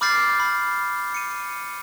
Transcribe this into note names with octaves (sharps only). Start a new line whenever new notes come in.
B5 D6 F6 G6 A6 C7
B5
C#7 D#7